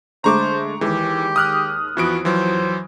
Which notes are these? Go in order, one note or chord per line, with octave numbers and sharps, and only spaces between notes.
D3 G#3 A3 C5 A#5 C#6 D6
D#2 E3 G#3 G4
D#6 F6 F#6
F2 E3 B3 F#4 D7
E3 F#3 C5